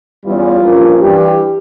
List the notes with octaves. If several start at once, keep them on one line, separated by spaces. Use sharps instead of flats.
E2 E3 G3 C#4 F4
G2 F3 A#3 C#4
G2 E3 G3 G4